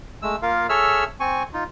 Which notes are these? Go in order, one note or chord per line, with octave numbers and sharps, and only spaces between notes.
G#3 A3 E6
A#3 F4 A#4 F5
G#4 A4 C#5 E5 E6 F6
C4 G#5 C#6
D#4 F4